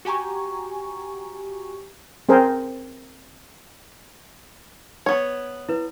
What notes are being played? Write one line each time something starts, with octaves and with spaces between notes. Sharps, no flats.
F#4 G4 G#5 A#5 C#6
C4 G#4 A#4 C5
B3 C#5 G#6
E4 B4